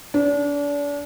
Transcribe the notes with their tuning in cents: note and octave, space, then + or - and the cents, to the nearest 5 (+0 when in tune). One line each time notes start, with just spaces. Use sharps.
D4 -35